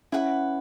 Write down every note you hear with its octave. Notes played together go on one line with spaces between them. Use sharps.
C#4 E4 B4 F#5